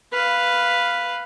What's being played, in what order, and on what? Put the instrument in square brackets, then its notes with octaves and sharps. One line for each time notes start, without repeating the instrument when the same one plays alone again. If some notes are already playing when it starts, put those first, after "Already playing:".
[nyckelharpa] B4 F5